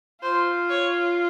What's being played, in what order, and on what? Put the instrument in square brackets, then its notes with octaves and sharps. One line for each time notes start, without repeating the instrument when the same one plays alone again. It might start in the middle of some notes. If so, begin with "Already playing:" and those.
[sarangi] F4 [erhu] C5
[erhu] C#5